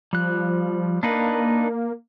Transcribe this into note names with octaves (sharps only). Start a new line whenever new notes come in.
F3 G3 F#6
A#3 D4 D#4 B4